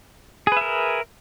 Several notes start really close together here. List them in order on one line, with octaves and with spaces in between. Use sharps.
G#4 B4 E5 A#4